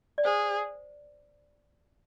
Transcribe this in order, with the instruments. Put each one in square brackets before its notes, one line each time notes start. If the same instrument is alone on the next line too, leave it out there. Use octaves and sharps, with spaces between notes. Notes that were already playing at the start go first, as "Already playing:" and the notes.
[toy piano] D5
[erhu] G#4 [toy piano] C5